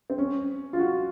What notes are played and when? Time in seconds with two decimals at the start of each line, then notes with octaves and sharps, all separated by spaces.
0.10 C4
0.18 C#4
0.73 F4
0.79 F#4